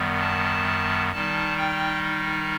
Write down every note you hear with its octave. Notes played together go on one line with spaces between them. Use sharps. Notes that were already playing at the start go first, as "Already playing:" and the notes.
Already playing: F#2 D#3 G3 B3
A5
D#3 G3 D#4 A5
G5